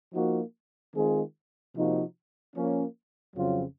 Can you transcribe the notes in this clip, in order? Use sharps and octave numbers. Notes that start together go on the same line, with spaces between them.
F3 A#3 D#4 F#4
D#3 G#3 C4 F4 G#4
C3 F3 A#3 D#4 F#4
F3 A#3 C#4
F2 C#3 F#3 C4 F4